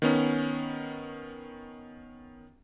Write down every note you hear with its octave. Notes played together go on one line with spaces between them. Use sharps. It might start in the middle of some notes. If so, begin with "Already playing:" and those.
D#3 B3 C#4